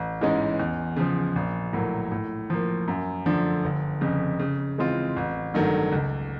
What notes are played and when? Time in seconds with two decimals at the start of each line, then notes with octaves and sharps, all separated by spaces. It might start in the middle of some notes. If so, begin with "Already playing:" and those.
Already playing: A1
0.21 G#2 E3 G#3 C#4
0.59 E2
0.97 C#3 F3
1.36 A#1
1.73 A2 F#3 A#3
2.12 A2
2.50 F3 A#3
2.88 F#2
3.26 D3 F3 A3 D4
3.64 G1
4.01 F2 C#3
4.39 C#3
4.78 E3 G#3 C4 F4
5.16 A1
5.54 G2 D#3 F#3 A3
5.92 C#2